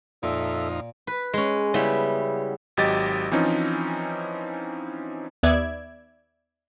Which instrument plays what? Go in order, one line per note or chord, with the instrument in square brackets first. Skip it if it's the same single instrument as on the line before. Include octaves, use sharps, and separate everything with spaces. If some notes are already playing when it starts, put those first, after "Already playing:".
[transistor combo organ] F2 D#4 F4 [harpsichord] A#2 [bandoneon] A4 E5
[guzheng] B4
G#3 C#4
C#3 G3 B3 E4
[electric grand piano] G#1 F#3 G4 D#5 A6
E3 F3 C4 C#4 D#4
[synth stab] D#2 B3 D5 E5 G#6